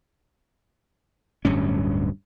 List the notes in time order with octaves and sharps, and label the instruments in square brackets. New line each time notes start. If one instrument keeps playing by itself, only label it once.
[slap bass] D1 D2 G2 C#4